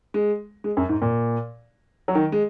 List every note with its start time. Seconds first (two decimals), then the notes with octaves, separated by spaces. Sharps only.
0.14 G#3
0.64 G#3
0.77 F#2
0.89 G#2
1.02 A#2
2.08 F#3
2.15 D#3
2.32 G#3